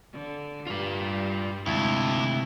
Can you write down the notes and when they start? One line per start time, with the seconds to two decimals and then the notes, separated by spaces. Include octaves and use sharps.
0.13 D3
0.67 G2 G3 F4 D5
1.66 D2 C3 G#3 E4 F5